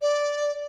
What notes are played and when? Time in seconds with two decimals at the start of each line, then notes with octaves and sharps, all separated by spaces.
0.01 D5